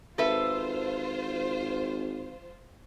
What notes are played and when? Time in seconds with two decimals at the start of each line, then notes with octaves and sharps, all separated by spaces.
0.18 G#1 F4 A4 B4 C5 E5